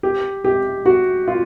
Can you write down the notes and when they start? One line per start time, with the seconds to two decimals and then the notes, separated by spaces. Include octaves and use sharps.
0.03 G4
0.44 G4
0.86 F#4
1.28 F4